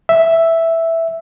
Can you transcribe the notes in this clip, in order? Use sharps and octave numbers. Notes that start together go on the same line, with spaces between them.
E5